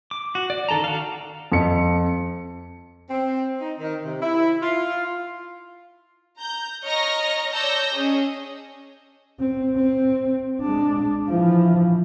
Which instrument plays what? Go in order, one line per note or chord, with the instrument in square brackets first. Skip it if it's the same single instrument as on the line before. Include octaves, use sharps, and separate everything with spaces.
[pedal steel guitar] D6
F#4
D5
D3 D#3 A4 A5 A#5
F#4 F5
[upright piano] F2 C#7
[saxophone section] C4
D#4
D#3
C3
E4
F4
[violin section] A#5 G6
C#5 D#5 A#5 C#6 F6 A#6
C#5 D5 A5 E6 G6 A#6
C#4 G#4 D#5
[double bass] C4
C4
G#3 D4
E3 F3